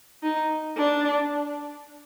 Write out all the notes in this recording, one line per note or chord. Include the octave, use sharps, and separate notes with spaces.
D#4
D4